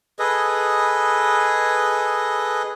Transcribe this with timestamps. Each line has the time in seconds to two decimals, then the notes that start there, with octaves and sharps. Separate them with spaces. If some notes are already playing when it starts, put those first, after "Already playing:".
0.19 G#4 A4 B4 D#5